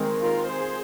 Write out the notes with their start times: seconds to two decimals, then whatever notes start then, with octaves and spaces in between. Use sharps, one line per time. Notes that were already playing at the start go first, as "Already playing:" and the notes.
Already playing: D#3 G#3 C4
0.20 F4 A#4
0.48 G#4 C5